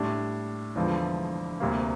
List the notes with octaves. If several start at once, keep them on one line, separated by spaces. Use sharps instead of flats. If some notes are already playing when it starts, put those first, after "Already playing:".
Already playing: A2 G3 D4
E1 E2 D3 F3
D2 C3 G3 A#3